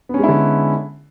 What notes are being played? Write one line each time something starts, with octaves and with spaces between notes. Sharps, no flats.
D3 G#3 B3 C#4 E4